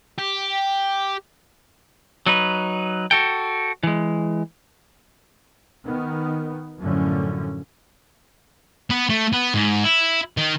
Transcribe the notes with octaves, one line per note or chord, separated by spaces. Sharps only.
G4
F#3 D#4 B4
F#4 A4 G5
E3 G#3
D#3 B3
F#2 A2 D3 F3 F#3 C#4
B3
A3
B3
G#2
E4
D#3